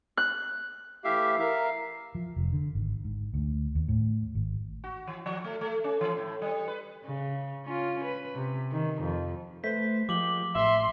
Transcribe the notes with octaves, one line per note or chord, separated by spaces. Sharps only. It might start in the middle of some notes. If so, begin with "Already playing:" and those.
F#6
E3 A3 E4 G4 E5 F5
A#4 E5 F5
F3
F1
D3
G#1
G#2
D2
D#2
A2
G#1
F#4
E3
F3
A3
A3
C#4
E3
A2
G3
B4
C#3
C#4 F4
B4
C3
D#3
F2
A3 B4 C5 B6
F3 G#3 A#3 G4 D6 F#7 G7
A1 E5 C6